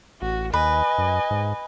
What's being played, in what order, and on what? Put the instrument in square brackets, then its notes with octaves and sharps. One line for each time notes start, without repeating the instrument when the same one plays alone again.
[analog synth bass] A1 [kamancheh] F#4
[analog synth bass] D#2 [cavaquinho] B4 [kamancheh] D#5 G#5
[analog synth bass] F#2
G#2